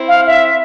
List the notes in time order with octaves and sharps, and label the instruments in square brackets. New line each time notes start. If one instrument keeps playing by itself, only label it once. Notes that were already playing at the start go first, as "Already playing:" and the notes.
Already playing: [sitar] C4 E4
[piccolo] F5
E5